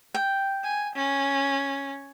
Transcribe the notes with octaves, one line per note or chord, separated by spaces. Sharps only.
G5
G#5
C#4